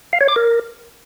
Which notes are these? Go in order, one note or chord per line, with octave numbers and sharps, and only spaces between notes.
F5
C#5
D6
A#4